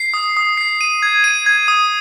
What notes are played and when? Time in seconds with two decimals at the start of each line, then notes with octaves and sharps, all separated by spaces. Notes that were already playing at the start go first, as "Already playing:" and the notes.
Already playing: C7
0.14 D#6
0.37 D#6
0.57 C7
0.81 D#7
1.03 G#6
1.24 D#7
1.46 G#6
1.68 D#6